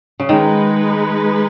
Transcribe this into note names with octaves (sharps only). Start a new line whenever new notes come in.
C#3
D#3 G#3 D#4 B4